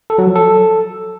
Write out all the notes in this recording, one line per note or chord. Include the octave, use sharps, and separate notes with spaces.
A4
F#3
F3
A4